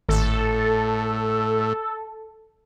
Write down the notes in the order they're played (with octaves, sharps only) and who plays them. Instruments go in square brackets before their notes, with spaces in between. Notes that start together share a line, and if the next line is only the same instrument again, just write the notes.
[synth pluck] G#1 [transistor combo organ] A2 [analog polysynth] A4